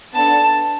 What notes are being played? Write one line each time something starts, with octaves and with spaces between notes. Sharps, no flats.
B3 D4 A4 A5